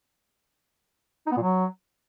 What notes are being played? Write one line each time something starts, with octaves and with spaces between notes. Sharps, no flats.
D#4
B3
A#2
F#3